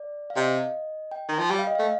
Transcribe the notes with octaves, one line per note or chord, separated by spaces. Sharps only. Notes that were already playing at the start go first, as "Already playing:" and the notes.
Already playing: D5
F5
C3 D#5
G5
D#3
F3
G3 G5
F5
D#5
F5
A3